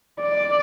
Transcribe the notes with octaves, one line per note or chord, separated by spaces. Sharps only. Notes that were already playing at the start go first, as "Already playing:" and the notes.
D5